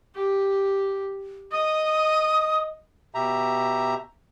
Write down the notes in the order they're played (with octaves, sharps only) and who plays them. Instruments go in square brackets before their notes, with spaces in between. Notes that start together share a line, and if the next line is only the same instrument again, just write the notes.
[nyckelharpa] G4
[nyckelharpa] D#5 [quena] D#6
[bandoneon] B2 G4 E5 A#5